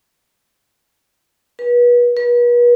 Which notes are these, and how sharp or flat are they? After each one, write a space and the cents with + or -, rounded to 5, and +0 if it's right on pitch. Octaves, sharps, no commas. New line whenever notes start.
B4 -30
B4 -40